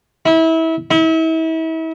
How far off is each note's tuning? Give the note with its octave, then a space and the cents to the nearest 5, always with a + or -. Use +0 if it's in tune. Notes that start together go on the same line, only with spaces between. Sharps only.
E4 -25
E4 -35